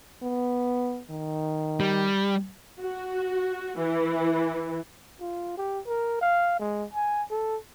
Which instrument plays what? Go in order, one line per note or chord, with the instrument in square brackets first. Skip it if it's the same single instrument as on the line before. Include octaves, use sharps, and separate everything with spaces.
[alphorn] B3
D#3
[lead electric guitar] G3
[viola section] F#4
E3
[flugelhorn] F4
G4
A#4
F5
G#3
G#5
A4